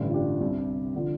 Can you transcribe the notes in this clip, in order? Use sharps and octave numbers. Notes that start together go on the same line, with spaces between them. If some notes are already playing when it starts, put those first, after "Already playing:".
Already playing: A1 G2 D3 G3
F4
D4 G4
C2 C3 G3
D3 F3